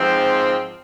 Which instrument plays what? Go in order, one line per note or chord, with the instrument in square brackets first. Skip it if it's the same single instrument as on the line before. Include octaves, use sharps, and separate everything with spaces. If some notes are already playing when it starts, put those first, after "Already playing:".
Already playing: [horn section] G#2 F3 C4